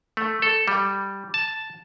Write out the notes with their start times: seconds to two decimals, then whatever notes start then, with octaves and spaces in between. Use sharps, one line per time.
0.17 A3
0.42 A4
0.68 G3
1.34 A5